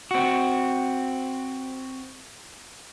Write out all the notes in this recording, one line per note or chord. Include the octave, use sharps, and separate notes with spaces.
C4 F#4